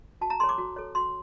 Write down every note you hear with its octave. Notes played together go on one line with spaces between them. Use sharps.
F#4 A5
A#5
A4 C#5 C6
D6
F#4
A4 C#5
F#4 C6